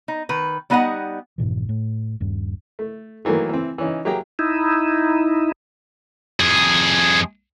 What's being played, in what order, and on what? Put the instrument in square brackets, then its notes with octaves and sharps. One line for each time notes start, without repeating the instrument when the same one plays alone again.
[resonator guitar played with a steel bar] D#4
D#3 B4
G3 B3 D#4 D#5 F5 F#5
[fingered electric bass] F1 G#2 B2 E3
A2
D#1 G2
[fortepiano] A3
D#3 E3 F#3 A3 A#3
E3 C4
E3 C#4 D#4
F#3 A#3 G4 G#4 G5 A#5
[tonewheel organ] D#4 E4
[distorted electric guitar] F2 G#4